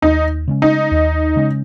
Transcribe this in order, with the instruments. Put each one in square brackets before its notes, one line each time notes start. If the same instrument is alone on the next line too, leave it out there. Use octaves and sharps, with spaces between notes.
[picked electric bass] D#2 [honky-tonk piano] D#4
[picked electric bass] C#3 G#3 C#4
[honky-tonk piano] D#4
[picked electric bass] D#2
C#3 G#3 C#4